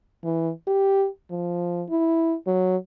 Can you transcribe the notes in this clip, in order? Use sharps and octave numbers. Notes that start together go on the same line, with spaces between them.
E3
G4
F3
E4
F#3